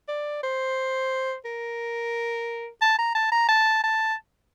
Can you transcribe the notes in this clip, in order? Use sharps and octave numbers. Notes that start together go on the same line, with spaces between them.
D5
C5
A#4
A5
A#5
A5
A#5
A5
A5